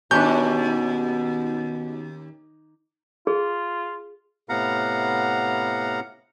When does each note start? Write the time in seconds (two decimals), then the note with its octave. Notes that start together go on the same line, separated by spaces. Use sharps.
0.11 D#2 B2 C#4 D4 B4 G6
3.27 F4 G#4
4.49 A2 C3 B3 F5 F#5 A#5